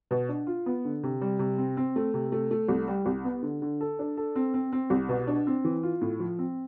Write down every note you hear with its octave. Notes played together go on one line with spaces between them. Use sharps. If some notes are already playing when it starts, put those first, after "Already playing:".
B2
D4
F4
B3
D3
C3
G3
C3
C4
C4
A3
C3
A3
A3
C2
G3
C2
B3
D3
D3
A4
D4
A4
C4
C4
C4
C2
B2
D4
C4
E3
F4
A2
F3
C4